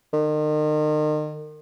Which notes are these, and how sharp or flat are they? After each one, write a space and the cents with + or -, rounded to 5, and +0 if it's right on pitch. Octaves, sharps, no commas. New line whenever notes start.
D#3 -35